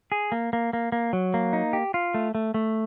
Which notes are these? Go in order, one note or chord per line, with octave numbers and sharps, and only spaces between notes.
G#4
A#3
A#3
A#3
A#3
F#3
A#3
D#4
G4
F4
A3
A3
A3